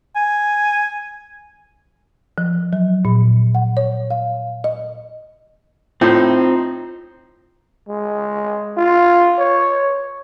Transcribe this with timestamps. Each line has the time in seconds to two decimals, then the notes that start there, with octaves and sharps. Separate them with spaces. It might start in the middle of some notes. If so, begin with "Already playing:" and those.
0.16 G#5
2.38 F3
2.73 F#3
3.05 A#2
3.55 F#5
3.77 C#5
4.10 F5
4.64 D#5
6.01 A2 C4 D#4 F4 C5 G6
7.89 G#3
8.77 F4
9.38 C#5